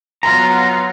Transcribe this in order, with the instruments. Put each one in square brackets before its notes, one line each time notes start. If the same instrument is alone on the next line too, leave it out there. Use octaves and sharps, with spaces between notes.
[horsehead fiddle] F#3 B3 [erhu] F4 [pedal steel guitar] A#5